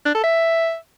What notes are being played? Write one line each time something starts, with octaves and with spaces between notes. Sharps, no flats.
D4
A4
E5